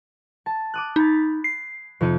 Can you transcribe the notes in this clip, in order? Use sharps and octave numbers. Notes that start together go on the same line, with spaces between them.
A5
D6 D#6 F#6
D#4 B5 G#6 A6
C7
F2 C3 D#4